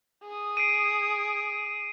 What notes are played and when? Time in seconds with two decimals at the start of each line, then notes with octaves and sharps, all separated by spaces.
0.24 G#4 D#6
0.57 C7 D7 D#7